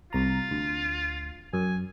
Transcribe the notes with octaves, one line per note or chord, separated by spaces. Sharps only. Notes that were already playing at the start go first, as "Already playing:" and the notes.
C2 F4 A#5
D2
F#2 G#5